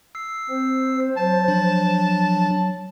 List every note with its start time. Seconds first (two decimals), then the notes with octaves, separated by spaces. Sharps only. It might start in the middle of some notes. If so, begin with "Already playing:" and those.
0.15 E6 C7
0.50 C4 C5
1.18 F#3 A5
1.48 F3 D4